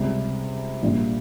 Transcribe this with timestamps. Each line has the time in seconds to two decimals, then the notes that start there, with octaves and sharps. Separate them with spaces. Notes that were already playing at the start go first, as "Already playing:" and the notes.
Already playing: C#2 C3 G3
0.83 A#1 A#2 G3